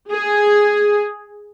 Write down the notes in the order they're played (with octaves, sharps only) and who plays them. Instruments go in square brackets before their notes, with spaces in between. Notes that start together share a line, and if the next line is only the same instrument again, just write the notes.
[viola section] G#4